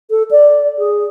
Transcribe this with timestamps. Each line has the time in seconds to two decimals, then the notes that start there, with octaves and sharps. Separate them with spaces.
0.10 A4
0.31 D5
0.78 G#4